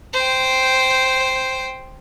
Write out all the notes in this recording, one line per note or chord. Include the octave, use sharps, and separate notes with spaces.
C5 G5